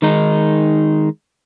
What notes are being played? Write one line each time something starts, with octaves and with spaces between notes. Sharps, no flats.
D#3 G#3 D#4